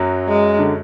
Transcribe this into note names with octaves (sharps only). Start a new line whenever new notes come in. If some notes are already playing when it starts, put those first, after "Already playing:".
Already playing: F#2 F#3
G#3
D3